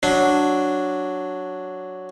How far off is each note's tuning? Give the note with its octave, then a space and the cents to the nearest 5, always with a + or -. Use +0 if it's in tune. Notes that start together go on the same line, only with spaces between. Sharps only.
F#3 +0 D4 +0